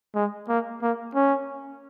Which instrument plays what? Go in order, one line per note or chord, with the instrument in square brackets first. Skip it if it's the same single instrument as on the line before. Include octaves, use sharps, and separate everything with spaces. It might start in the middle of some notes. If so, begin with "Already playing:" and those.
[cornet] G#3
A#3
A#3
C#4